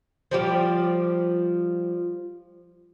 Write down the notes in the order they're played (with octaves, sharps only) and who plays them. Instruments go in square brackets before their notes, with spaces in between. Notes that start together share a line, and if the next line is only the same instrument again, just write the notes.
[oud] F3 G3 G4